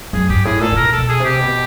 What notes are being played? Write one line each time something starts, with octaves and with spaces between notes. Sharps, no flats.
F#2 G#4
G2 G4
A2 G#4
A#2 A4
A#2
B2 A#4
A4
B2
G#4
C3 G4
B2